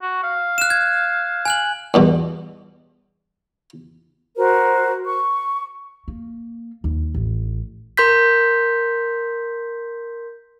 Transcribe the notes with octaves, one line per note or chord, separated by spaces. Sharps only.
F#4
F5
F#6 E7
G#6
G#5 F#6 F#7
E2 G2 B2
F#4 A#4 C5
C#6
A#3
D#2
A1
A#4 C6 G6 B6